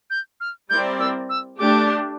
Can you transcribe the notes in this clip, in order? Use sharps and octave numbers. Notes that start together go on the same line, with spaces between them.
G6
F6
G3 C4 E4 A#4 D5 G6
E6
E6
A3 D4 G4 D6